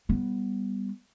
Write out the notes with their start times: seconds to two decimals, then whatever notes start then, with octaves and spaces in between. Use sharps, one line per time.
0.09 G3 B3